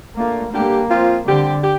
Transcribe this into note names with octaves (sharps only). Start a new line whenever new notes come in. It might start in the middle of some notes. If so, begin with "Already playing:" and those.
A#2 A3 A#3 D4 F4
D3 G3 A#3 D4 G4
F3 C4 F4
D3 G3 C4 G4
G4